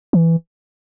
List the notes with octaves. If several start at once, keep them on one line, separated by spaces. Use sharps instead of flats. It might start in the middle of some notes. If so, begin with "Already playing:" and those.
E3